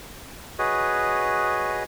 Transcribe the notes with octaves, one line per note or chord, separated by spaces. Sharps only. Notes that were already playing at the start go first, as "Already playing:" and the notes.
F#4 G#4 B4 C#5 D#5